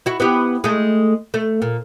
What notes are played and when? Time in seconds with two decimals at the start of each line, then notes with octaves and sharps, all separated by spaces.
0.06 E4 F#4
0.20 B3 E4 G4
0.64 G#3 A3
1.34 A3
1.62 A#2